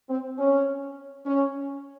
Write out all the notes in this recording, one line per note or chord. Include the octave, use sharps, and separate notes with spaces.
C4
C#4
C#4